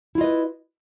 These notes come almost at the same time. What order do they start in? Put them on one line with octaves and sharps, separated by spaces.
E4 F4 D#5 B4